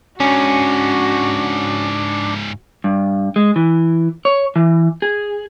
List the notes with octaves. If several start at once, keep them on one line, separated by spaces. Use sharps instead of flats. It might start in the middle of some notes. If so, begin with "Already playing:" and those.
G#2 C#3 C#4 D4 F#4
G2
G#3
E3
C#5
E3
G#4